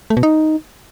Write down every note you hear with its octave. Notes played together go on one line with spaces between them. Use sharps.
A3
B2
D#4